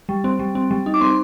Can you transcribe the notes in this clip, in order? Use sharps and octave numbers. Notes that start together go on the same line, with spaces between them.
G3
C4
G3
C4
G3
D#4
D6
C4 C6